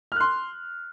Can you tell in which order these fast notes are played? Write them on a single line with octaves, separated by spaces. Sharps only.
F6 F#6 C6